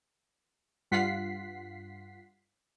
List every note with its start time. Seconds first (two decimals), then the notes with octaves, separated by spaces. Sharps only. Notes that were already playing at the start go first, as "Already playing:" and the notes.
0.91 G2 F4 F#5 B6 C7